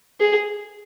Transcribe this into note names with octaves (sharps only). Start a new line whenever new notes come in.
G#4